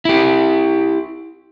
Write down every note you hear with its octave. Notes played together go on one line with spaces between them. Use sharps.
E4 G4